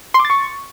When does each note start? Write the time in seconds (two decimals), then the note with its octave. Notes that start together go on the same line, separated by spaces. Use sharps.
0.14 C6
0.20 D6
0.25 A6
0.30 C#6